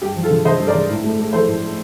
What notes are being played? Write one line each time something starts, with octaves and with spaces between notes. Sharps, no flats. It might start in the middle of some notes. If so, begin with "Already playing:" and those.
G2 G4
F3
F4 A4
D3
D3 C5 D#5
G2
A#4 D5
D3
A2
A3
A3
F3 A4 C5
A2
A3